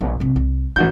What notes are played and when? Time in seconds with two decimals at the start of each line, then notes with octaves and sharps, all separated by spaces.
0.01 A#1
0.20 A#1 C3
0.36 C2
0.76 A1 D#4 F#4 G6